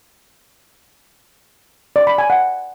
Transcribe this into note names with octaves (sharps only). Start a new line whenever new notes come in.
D5
B5
G#5
F#5